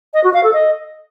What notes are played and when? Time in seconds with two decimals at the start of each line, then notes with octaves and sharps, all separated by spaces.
0.14 D#5
0.24 F#4
0.34 F5
0.44 A4
0.53 D#5